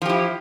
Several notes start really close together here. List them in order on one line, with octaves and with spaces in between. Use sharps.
F3 G4 E4